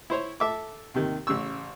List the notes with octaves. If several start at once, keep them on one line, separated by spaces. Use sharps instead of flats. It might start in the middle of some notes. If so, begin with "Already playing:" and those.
E4 C5 C#5
A4 E5 D6
D#2 C3 D#3
A1 C#3 C#6 E6